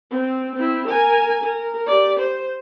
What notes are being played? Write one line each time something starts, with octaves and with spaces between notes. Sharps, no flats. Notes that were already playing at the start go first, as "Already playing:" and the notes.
C4
C4 E4
A#4 G#5
A#4
G4 D5
C5